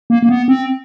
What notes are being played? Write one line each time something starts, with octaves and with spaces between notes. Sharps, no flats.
A#3
A#3
B3
C4